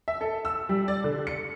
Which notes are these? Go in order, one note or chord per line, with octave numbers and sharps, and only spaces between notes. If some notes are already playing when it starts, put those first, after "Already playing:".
E5
A4
E6
G3
D5
D3
C#7